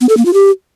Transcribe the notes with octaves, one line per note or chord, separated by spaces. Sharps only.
B3
A4
A#3
F4
G4